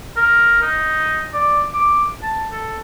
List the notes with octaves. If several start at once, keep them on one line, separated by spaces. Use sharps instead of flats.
A#4
D#4
D5
D6
A5
A4